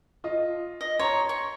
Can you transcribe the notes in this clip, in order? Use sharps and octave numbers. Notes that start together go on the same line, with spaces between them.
F4 D#5
D#5
C#5 A#5 C6
C#6